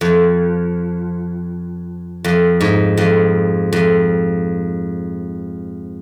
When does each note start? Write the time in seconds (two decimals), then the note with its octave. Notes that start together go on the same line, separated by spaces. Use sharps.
0.01 F2
2.24 F2
2.61 G#2
2.97 F2
3.73 F2